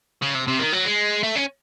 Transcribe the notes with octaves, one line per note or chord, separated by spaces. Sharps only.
C#3
C3
C3
D#3
F#3
G#3
A3
C#4